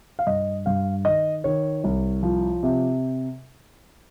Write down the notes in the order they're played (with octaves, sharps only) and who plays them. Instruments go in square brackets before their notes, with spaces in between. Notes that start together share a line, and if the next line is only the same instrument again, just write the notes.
[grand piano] F5
G2 D#5
G2 F5
D#3 D#5
D#3 C#5
C2
F3
C3